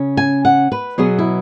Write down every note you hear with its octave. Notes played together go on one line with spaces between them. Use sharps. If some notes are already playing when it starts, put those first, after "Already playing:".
Already playing: C#3 C#4
G#5
F#5
B4
B2 F#3 B3 G#4
E4